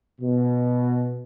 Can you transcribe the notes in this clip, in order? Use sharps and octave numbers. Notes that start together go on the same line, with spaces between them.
B2